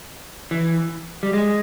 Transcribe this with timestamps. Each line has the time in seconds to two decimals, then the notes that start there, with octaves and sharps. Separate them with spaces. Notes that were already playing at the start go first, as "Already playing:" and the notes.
0.51 E3
1.23 G3
1.33 G#3